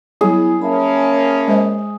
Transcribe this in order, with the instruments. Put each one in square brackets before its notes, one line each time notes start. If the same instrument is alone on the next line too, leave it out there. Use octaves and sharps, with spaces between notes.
[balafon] F#3 G3 [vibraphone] B3 E4 [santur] G#4
[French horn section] A#3 C#4 [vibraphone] E5 A5 B5
[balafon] G#3 C5 D#5